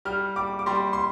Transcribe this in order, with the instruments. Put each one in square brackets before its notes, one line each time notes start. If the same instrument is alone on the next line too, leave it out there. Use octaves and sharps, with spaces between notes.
[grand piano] G3 F6
G3 D6
D6
G3 C6
C6